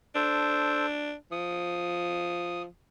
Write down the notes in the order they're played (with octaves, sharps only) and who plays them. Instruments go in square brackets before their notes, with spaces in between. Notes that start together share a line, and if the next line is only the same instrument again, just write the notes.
[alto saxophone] D4 [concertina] A4 C5
[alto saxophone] F3 [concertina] D#6